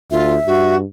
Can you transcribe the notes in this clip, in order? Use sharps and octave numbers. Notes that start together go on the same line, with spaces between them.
D2 F4 E5
G2 F#4